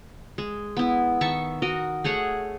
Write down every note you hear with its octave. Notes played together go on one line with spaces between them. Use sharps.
G#3
B3 E4
D#3 E5 A5 C#6
F#4 A#4 D#5
A3 G#4 C#5 F#5